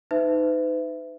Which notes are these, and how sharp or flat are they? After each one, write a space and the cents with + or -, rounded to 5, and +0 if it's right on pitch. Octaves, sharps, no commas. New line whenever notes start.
D#4 +0 B4 +45 E5 +5